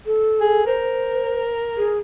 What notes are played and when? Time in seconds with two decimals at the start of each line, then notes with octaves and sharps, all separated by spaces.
0.06 A4
0.41 G#4
0.66 A#4 C5
1.77 G#4